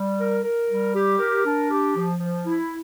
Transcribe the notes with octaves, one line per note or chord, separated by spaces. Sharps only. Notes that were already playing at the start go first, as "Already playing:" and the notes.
Already playing: G3
A#4
A#4
G3
G4
A#4
D4
G4
F3
F3
E4